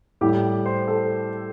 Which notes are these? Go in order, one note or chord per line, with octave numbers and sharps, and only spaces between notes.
A2 G3 G4
C5
A4